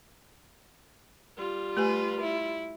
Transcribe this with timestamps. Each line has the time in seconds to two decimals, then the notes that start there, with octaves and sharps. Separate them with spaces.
1.37 G3 F4
1.77 A3 G4 B4 G#5
2.20 E4